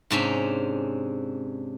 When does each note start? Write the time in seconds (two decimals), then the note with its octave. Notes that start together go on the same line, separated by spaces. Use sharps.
0.10 G#2 C3 C#4 D4